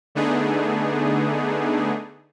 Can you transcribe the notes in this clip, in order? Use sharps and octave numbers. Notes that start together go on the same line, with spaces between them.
D3 A3 B3 D4 D#4 G#4